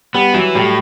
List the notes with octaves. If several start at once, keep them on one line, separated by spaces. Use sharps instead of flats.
G3 B3
E3 F#3
A2 G3